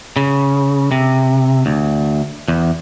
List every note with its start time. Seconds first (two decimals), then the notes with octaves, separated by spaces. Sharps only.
0.16 C#3
0.92 C3
1.66 D2
2.48 E2